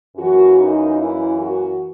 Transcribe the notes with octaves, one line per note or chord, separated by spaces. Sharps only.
F#2 E3 A#3 F#4
D#4
E4
F#4